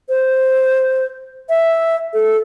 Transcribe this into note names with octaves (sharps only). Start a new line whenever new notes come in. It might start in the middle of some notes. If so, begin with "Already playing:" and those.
C5
E5
A4